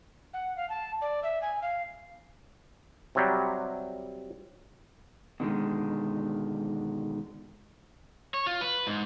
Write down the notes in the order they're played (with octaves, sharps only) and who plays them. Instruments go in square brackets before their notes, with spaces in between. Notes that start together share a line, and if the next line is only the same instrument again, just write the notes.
[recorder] F#5
F5
A5
D5
E5
G#5
F5
[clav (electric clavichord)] C3 F#3 G3
[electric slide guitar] B2 D3 D#3 G#3
C#5
F4
B4
G#2